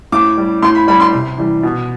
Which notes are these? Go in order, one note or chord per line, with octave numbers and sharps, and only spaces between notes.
A2 D6
G3
A2 C6
B5
G3 B5
C6
C3
E3 G3
B2